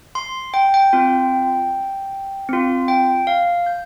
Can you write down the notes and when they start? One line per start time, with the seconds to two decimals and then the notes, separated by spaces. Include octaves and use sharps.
0.15 C6
0.54 G5
0.74 G5
0.93 C4 F4
2.49 C4 F4
2.88 G5
3.27 F5
3.66 G6